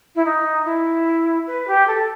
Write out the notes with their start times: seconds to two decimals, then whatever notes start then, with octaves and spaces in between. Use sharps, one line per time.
0.15 E4
0.25 D#4
0.65 E4
1.47 B4
1.68 G4
1.87 A4